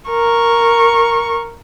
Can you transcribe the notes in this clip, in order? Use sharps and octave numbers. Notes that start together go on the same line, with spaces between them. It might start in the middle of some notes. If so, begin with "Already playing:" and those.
A#4 C#6